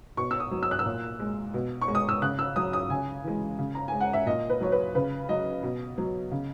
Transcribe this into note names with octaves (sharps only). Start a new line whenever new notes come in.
B2 C#6
E6
D#6
F#3
E6
F#6
E6
A#2
G#3
B2
C#6
G#3
D#6
E6
C#3 F#6
E6
F#3 D#6
D#6
C#3 G#5
E3 G#3
C#3
A#5
G#3 G#5
F#5
E5
A#2 D#5
B4
F#3 C#5
B4
C#3 B4
F#3 D#5
B2
F#3
C#3